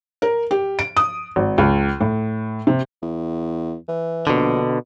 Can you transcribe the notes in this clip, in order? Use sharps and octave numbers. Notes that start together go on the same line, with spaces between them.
A#4
G4
D7
D#6
G#1
C#2
A2
C3
E2
E3
A#1 B2 D3